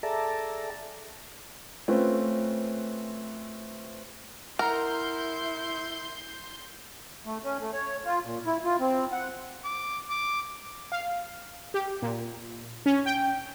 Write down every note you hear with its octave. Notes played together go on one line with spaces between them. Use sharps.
G#4 A4 D5 E5 A5 A#5
A3 C4 C#4 F4 B4
E4 A#4 F#5 A#5 C6 G6
A3
C#4
A3
C#5
F4
A#2
E4
F4
C4
F#5
D6
D6
F5
G4
A#2
C#4
G5